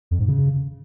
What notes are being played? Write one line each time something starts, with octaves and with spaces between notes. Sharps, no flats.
F2
G#2
C#3